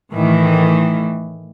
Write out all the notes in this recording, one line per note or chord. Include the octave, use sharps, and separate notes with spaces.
A2 D#3 E3